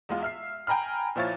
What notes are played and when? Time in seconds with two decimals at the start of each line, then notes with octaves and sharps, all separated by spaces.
0.09 E2 G#3 F4
0.22 E5 F6 C7
0.67 G5 G#5 A#5 B5 F6
1.16 A#2 F3 E4 F4 C#5 A6